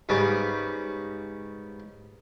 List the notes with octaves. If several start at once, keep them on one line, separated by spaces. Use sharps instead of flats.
G#2 C#3 G3 B3